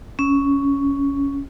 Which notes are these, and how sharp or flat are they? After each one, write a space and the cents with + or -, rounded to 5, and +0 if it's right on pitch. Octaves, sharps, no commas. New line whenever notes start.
C#4 +10